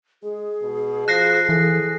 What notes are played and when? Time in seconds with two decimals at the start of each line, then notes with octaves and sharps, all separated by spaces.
0.23 G#3 G#4
0.62 B2
1.08 F3 F#6 A#6 C7
1.49 E3 G#4 A4